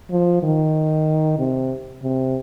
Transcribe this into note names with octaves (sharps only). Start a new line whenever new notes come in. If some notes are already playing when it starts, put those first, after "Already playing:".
F3
D#3
C3
C3